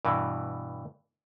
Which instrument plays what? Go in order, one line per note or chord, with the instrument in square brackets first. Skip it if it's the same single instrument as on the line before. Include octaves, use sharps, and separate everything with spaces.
[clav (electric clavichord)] G2 B2 E3